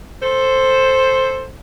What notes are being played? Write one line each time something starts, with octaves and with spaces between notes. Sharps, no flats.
A4 C5